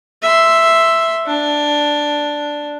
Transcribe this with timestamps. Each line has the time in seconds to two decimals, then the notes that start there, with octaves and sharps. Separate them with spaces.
0.23 E5 C6
1.26 D4